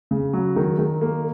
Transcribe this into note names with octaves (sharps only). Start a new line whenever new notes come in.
C#3
F#3
D#3
D#3
A#3